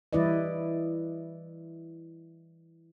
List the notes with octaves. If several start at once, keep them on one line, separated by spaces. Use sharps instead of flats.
E3 G3 E4 B4 D5 D#5